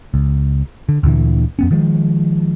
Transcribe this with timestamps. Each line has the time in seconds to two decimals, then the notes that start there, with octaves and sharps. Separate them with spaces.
0.14 C#2
0.89 D3
1.03 D2 A#2 D3 E3
1.59 F2 B3 C#4
1.71 D#3 F3 G#3